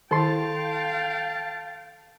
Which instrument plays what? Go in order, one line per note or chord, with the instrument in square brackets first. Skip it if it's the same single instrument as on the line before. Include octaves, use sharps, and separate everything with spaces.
[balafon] D#3 E4 [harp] A4 C6 [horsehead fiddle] F5 G5 [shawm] A5